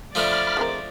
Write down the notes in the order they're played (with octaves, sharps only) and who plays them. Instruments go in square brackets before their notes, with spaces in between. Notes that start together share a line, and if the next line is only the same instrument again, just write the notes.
[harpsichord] F3 A3 D4 [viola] D5 [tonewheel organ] B5 F6
[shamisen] G#3 C4 A#4